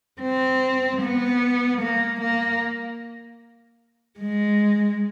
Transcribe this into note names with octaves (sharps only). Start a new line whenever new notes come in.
C4
B3
A#3
A#3
G#3